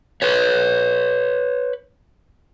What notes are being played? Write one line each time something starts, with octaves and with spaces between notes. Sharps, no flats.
B4 C#5